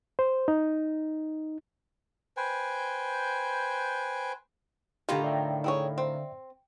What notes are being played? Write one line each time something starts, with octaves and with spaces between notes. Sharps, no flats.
C5
D#4
B4 C5 G5 G#5
A2 D3 D#3 F4 G4 F5 A#5
D5 E5 G5
E4 G#4 C#5
C4